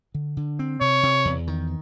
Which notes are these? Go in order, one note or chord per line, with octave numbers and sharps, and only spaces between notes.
D3
D3
C4
C3 C#5
C3
E2
D#3